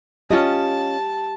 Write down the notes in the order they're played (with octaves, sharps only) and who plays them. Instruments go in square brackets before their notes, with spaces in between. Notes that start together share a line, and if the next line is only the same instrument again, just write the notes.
[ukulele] C#4 F4 D#5 [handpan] G4 [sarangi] A5